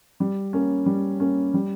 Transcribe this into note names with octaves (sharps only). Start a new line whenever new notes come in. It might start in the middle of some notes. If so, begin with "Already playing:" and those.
G3
A#3 C#4
G3
A#3 C#4
G3